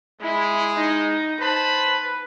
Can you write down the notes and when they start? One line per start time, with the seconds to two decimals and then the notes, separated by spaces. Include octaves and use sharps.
0.21 G#3 E4
0.75 D#4
1.41 B4 C5 A5 B5